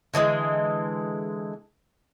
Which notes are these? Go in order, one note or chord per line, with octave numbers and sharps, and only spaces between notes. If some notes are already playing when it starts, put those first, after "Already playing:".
D3 E3 F#3 G#3